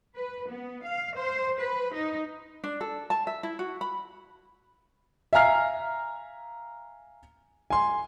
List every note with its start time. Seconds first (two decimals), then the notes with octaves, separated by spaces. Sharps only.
0.15 B4
0.49 B3
0.84 F5
1.16 C5
1.59 B4
1.93 D#4
2.64 D4
2.81 A4
3.10 A5
3.27 E5
3.43 E4
3.59 F#4
3.81 B5
5.33 E5 F5 G#5 A#5 F6 C7
7.70 G#5 C6